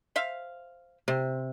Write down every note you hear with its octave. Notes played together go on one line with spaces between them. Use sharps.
C5 E5 F5
C3 C4